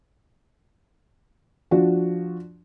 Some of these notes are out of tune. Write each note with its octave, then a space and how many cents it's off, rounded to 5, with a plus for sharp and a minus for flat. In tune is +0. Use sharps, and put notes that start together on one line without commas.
F3 +0 D4 +0 F#4 +0